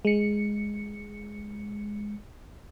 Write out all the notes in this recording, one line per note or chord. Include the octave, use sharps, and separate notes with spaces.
G#3 C#7